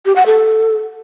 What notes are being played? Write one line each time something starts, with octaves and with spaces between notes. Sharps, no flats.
G4
F#5
A4